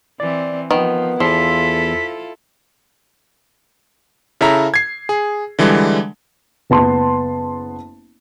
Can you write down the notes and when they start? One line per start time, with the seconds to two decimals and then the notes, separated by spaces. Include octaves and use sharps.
0.20 E3 C4 D5
0.71 D#3 F3 B3
1.20 E2 F3 E4 F4 A4 C6 E6 B6
4.41 C#3 E4 A4 E5 A#5
4.74 G#6 C7
5.09 G#4
5.59 D3 E3 G3 G#3
6.70 F#1 B3 A5 C6